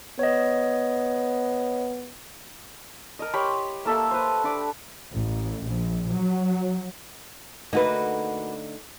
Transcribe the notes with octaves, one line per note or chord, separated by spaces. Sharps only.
B3 C#5 D#5
A#4 D#5
G4 C#5 B5 C6
A#3 A4 E5
B4 C5
D4 B5 D6
A1
A#1
F#3
D3 A3 A#3 D#4 F#4 B4